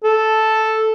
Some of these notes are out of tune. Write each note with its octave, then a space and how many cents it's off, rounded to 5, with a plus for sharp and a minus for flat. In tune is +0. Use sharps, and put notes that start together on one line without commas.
A4 -5